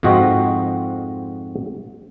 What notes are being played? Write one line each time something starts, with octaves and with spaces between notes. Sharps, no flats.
F2 G#2 F3 C4 F#4 D#5